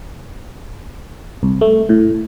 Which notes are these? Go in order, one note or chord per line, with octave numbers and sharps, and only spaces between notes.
C2
A3
A2